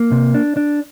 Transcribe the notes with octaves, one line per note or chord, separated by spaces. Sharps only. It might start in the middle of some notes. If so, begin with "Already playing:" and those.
Already playing: A#3
C3
D4
D4